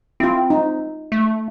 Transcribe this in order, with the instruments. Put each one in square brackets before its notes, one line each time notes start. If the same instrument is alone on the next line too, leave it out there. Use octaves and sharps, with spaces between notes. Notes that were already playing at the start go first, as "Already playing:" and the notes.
[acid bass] C4 [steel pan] E4 F4
[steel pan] D#4
[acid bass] A3